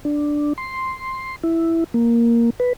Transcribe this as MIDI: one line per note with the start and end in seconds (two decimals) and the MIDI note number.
0.05 0.53 62
0.58 1.36 84
1.44 1.84 64
1.94 2.50 58
2.60 2.73 71